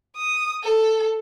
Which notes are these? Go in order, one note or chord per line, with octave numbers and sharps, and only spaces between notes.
D#6
A4